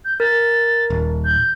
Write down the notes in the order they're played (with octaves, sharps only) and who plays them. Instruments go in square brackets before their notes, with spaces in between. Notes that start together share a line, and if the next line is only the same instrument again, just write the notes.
[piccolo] G6
[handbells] A#4 [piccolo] A6
[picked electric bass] D#1
[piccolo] G6